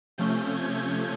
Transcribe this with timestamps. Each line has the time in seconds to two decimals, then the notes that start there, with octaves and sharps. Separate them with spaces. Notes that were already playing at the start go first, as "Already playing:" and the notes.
0.18 C3 F3 A3 C#4 G6
0.56 G#6